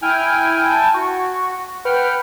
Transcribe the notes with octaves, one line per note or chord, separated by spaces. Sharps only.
E4 G5 G#5 F6
A5
F#4 C#6
B4 F#5 G5 F6